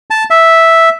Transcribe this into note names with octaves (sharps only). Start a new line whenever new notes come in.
A5
E5